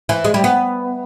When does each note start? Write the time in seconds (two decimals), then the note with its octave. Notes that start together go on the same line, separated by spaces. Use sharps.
0.09 E3
0.25 G#3
0.34 G3
0.44 B3